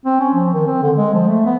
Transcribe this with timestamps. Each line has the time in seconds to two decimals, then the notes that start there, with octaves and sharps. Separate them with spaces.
0.06 C4
0.20 C#4
0.34 F3
0.54 D#3
0.67 C4
0.83 D3
0.97 G#3
1.14 F3
1.28 A3
1.46 B3